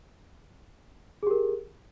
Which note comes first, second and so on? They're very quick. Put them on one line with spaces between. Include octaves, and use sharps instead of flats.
G#4 G4 A#4